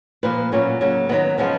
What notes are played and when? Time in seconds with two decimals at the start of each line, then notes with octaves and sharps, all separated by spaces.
0.23 A#2 F3 A#3 B4
0.52 A#2 F#3 A#3 C#4
0.81 C#3 F#3 A#3
1.09 D#3 F#3 B3 D#4
1.38 C#3 F3 G#3 B3